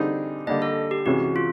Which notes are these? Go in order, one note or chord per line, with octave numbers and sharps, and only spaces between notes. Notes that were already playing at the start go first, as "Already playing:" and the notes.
Already playing: D3 G3 C4 D#4 G#4
D3 G3 A#3 D4 D#5
A4
G4
C3 E3 G#3 C#4 F#4
F4